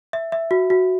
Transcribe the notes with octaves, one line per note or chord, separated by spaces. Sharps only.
E5
E5
F#4
F#4